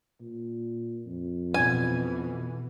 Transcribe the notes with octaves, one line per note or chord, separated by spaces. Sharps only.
A#2
F2
B2 E3 G#5